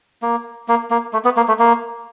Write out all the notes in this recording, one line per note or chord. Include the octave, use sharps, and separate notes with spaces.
A#3
A#3
A#3
A3
B3
A#3
A3
A#3